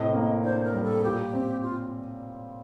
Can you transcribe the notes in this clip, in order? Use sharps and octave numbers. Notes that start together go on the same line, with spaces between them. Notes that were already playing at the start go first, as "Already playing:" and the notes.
Already playing: A2 C3 D#5
A#3
D4 C5
A#4
G3
A4
A#2 G4
C4
F4